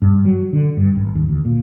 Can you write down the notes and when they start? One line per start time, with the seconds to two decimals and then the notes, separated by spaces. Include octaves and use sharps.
0.02 G2
0.25 F#3
0.53 D3
0.77 G2
0.95 G#1
1.15 D#2
1.28 D2
1.45 A#2